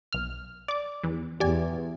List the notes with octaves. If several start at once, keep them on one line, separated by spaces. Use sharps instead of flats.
B1 F6
D5 D6
E2
E2 G4 D5 G#5